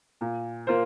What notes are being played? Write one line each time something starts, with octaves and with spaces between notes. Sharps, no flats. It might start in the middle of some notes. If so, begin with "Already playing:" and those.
A#2
A#3 F4 C5